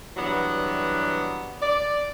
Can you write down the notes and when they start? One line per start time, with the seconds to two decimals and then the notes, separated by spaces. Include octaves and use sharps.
0.16 E3 F#3 G3 B3 D4 F#4
1.62 D5